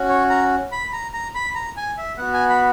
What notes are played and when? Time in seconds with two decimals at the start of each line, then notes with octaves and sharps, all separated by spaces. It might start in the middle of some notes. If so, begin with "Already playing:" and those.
Already playing: C#4 F#4
0.09 C#5
0.30 A#5
0.72 B5
0.93 A#5
1.13 A#5
1.35 B5
1.55 A#5
1.77 G#5
1.98 E5
2.17 B3 F#4 F#5
2.34 G#5
2.50 B5